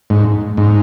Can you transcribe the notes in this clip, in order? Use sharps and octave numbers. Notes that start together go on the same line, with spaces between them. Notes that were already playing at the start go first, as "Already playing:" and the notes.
G#2
G#2